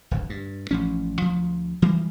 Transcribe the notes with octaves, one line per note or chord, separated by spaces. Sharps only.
D1 G#1 D2
G2
A1 F3 C#4
D2 F3
E3 G3 G#3